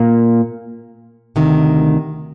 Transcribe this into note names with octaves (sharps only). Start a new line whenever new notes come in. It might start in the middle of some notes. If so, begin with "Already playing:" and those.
Already playing: A#2 A#3
D2 C3 D#3